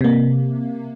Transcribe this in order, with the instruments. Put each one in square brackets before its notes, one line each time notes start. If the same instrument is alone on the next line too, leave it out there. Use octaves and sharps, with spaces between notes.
[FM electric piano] C3 A#3